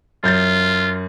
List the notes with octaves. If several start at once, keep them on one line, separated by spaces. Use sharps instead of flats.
F#2 F4 G6 A6